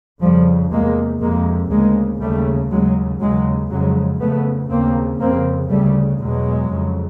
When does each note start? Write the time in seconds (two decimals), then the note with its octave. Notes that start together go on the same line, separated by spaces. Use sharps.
0.22 F2 C#3 F3 G3
0.71 E2 C3 G#3 A#3
1.21 F2 C3 G#3 A#3
1.71 D2 C#3 G#3 A#3
2.21 D#2 C#3 G3 A3
2.71 D#2 C#3 F#3 G#3
3.21 D#2 C#3 F#3 G#3
3.70 F2 C#3 F#3 G#3
4.21 F2 C#3 A3 B3
4.71 D#2 C#3 A#3 C4
5.20 F2 C#3 A#3 C4
5.70 D2 C#3 G3 A3
6.20 E2 B2 F#3 G#3
6.70 F2 C#3